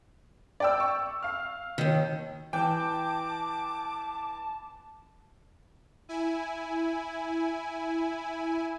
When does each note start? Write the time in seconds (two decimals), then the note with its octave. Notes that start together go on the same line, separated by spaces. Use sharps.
0.60 D5 G5 E6
0.80 C#6
1.23 F5 F6
1.78 D#2 D#3
2.53 E3 G5 A5 D6
6.09 E4 G#5